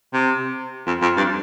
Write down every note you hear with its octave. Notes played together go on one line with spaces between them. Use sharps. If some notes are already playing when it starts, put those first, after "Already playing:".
C3
F2
F2
G2